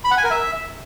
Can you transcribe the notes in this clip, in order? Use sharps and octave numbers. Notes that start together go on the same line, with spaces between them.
B5
F#5
G#5
A#4
E5